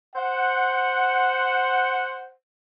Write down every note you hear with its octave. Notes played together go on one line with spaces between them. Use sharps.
C5 F#5